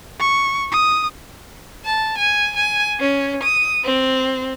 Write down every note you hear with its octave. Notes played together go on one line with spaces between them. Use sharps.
C#6
D#6
A5
G#5
G#5
C#4
D#6
C4